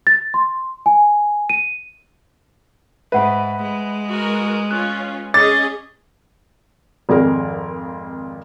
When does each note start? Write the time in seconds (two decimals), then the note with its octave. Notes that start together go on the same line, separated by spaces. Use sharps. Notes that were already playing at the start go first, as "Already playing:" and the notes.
0.07 A6
0.34 C6
0.86 G#5
1.50 D#7
3.12 G#2 B4 E5 F#5 B5
3.62 G#3
4.10 F#4 A#4
4.71 C#4 F4 F#6
5.34 C#4 G#4 D#5 D6 A6
7.09 G#1 F2 G#4 A#4